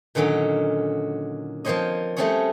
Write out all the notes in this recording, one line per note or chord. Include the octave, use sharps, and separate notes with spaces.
A#2 D3 D#3 F#3 C#4
F3 A#3 C4 C5 C#5 D#5
G3 A3 C4 C#4 G#4 C#5